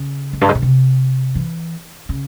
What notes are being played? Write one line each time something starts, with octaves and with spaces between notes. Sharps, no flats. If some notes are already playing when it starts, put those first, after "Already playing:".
Already playing: C#3
F2
G2
G#2
A#2
C3
E3
C#3